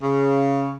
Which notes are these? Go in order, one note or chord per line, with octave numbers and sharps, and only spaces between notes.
C#3